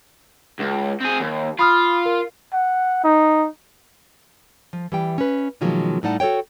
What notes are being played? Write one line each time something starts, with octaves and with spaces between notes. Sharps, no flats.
C#2
C4 G#4
D#2
F4 B5 D#6 F6
A#4
F#5
D#4
F3
E3 G3 G5
C#4 B4
B2 D#3 F3 F#3 G#3 A#3
A2 G3 D#4 D5 F#5 A5
F#4 A4 C5 C#5 G5